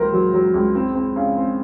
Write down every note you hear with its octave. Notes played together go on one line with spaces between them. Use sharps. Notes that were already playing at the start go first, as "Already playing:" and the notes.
Already playing: C#2 F#3 A#3 A#4 C5
F#3
F#3
C#2
C4
C4
C#3
C4